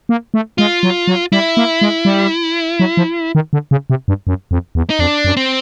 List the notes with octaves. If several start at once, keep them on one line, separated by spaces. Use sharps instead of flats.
A#3
A3
G#3 F4
F#3
F#3
G3 E4
A#3
G#3
G3
F#3
F3
D#3
D3
C#3
C3
G2
F#2
F2
E2
D#4
F2 D4
F#2
C4